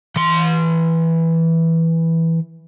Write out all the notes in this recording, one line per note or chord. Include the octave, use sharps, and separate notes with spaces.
E3 C6